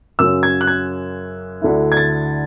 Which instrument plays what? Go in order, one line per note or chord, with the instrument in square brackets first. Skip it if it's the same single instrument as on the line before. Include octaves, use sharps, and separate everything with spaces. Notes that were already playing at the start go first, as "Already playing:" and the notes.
[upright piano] F#2 C#3 F#3 C#4 E6
G#6
F#6
G#6
D2 D3 A3 E4
G#6
A6